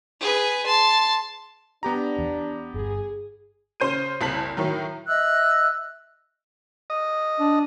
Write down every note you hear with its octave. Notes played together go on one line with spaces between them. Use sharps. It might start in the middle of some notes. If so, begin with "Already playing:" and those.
G#4 B4
A5 C6
B3 D4 G4 A#5
E2
G1 G#4
C#3 C5 G6 D#7
F#1 C2 A5 B6 F#7
A2 D#3 F#3
D#5 E5 E6 F#6
D#5
D4